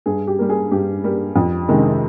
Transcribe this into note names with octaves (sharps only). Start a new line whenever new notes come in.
G2 G#4
G4
G3 A#3
G#4
G2 G4
G3 A#3
F2
C3 D#3 G#3